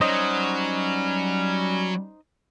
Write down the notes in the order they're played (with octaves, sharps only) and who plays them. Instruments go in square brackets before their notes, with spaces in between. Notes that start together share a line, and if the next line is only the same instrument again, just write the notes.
[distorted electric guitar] F#3 [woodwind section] G3 C#4 [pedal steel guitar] D#4 C5 D#5